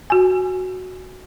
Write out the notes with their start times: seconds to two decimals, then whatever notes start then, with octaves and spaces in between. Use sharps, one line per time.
0.10 F#4 G#5